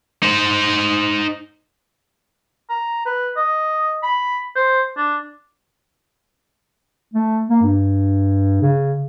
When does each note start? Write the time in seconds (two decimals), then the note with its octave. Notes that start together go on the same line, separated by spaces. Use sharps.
0.23 D#4 C5
2.70 A#5
3.06 B4
3.37 D#5
4.03 B5
4.56 C5
4.97 D4
7.14 A3
7.50 A#3
7.62 G2
8.62 C#3